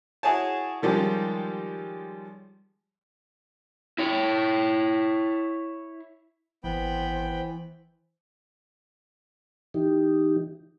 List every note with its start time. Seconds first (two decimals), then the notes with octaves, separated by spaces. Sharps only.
0.23 E4 F#4 G#4 C#5 G#5 A5
0.82 D#3 F3 G3 G#3 C#4
3.98 E4 C#5
6.64 G#1 E3 B3 C5 G5 B5
9.74 E3 D#4 G4